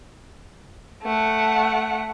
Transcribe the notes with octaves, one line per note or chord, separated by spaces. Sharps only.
A3 F#5